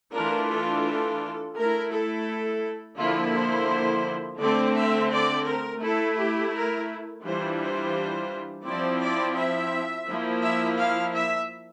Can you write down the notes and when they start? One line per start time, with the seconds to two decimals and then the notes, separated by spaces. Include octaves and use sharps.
0.15 E3 A3 D4 F4 A#4
0.50 A4
0.86 A4
1.56 A3 E4 A#4
1.91 A4
2.98 D3 F3 A#3 E4 F4
3.34 C5
4.40 D3 A3 C4 D5
4.75 E5
5.11 D5
5.45 A#4
5.81 A3 E4 A4
6.16 G4
6.52 A#4
7.23 E3 G3 D4 F4 C5
7.59 C5
8.65 F3 C4 E4 D5
9.00 D5
9.36 E5
10.07 F3 A#3 E4
10.41 E5
10.77 F5
11.13 E5